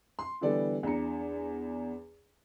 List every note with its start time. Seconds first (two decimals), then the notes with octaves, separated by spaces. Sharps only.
0.19 C6
0.41 D3 E3 G3 B3 A4 D5
0.83 E2 D4 A#5 C#7